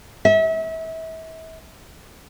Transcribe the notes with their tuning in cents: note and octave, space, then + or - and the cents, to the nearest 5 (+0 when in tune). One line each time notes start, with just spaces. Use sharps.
E5 -35